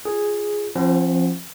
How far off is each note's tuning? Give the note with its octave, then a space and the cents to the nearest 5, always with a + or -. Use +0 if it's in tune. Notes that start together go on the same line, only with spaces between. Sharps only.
F4 -15 G#4 +0
F3 -10 C4 +40 F#5 +0